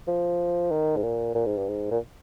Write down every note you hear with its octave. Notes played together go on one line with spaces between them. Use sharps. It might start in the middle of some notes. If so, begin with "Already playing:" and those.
F3
D#3
G#2
A#2
A#2
G#2
G2
G#2
A#2